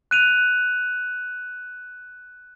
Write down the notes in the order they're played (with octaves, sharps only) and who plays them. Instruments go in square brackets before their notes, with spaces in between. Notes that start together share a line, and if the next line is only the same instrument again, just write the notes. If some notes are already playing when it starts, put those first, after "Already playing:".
[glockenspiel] F#6 D#7 F7